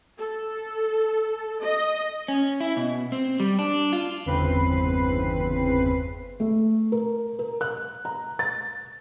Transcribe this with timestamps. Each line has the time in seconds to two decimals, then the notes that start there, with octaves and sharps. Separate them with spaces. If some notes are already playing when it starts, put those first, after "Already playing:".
0.18 A4
1.61 D#5
2.28 C#4
2.60 E4
2.77 B2
3.12 C4
3.40 G3
3.59 D4
3.93 F4
4.26 G1 E2 C#3 C4 B4 C7
6.40 A3
6.92 A#4
7.39 A#4
7.61 F#6
8.05 A#5
8.39 A6